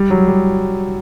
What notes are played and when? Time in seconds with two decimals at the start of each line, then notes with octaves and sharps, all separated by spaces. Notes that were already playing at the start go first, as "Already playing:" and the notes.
Already playing: G3
0.10 F#3
0.28 G3